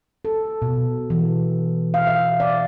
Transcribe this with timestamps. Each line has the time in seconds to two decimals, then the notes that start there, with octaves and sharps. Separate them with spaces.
0.25 A4
0.62 B2
1.10 E3
1.94 F5
2.07 E5
2.40 D5